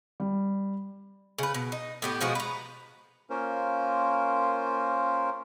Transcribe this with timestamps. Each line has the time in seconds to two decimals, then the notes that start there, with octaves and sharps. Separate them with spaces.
0.20 G3
1.39 C#3 B4
1.54 B2
1.72 D#4
2.02 A2 B3 G4
2.21 B2 F3 G#3 F#4
2.35 B4 A#5
3.30 A#3 C#4 F4 A#4 C5